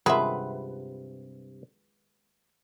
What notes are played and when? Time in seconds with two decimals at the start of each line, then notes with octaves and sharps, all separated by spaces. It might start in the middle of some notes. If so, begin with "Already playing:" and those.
0.06 G2 C3 G#3 F4 B4 E5 F#5 C6